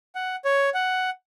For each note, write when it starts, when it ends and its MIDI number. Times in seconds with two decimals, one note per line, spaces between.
0.15 0.36 78
0.45 0.70 73
0.74 1.10 78